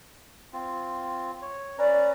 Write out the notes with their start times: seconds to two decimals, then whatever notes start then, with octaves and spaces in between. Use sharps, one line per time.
0.53 C4 F4
1.42 C#5
1.78 C#4 B4 D5 A#5